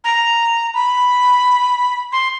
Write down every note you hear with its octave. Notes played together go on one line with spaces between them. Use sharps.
A#5
B5
C6